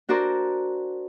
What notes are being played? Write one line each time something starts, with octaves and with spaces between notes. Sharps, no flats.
D4 F#4 A#4 C5 D5